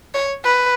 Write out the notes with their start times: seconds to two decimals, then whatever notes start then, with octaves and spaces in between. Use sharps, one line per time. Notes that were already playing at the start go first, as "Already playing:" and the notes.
0.14 C#5
0.44 B4